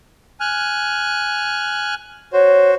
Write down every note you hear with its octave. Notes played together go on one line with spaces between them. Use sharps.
G#5 F6 F#6
F#4 C5 C#5